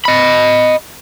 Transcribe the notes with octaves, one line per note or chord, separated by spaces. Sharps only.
D#5 B5